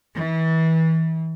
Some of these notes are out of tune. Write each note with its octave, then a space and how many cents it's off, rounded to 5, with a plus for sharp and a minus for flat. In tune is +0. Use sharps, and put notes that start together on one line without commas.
E3 -30